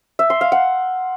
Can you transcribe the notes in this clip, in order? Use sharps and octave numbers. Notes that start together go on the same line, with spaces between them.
E5
C6
F5
F#5